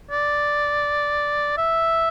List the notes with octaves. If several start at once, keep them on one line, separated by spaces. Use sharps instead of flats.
D5
E5